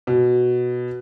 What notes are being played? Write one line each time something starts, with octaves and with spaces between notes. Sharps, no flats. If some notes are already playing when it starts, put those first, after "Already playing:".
B2